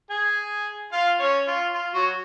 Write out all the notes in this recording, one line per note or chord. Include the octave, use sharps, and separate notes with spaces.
G#4 G#5
F4 F5
C#4 C#5
F4
F4
F#3 F#4